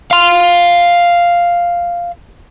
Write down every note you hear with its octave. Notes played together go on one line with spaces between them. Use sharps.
F5 C6